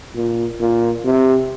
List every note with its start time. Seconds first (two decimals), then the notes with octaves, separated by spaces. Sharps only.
0.15 A#2
0.60 A#2
1.05 C3